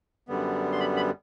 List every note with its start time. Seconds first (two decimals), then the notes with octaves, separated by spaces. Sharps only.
0.28 F#2 D3 G3 B3
0.72 C6
0.80 B5
0.96 B5